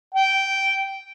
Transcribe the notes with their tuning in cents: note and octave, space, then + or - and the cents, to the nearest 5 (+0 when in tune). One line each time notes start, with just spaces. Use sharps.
G5 -10